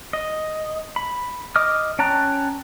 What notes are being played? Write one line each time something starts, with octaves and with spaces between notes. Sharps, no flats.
D#5
B5
D#5 D6 D#6 F6
C#4 G5 A5 A#5 F#6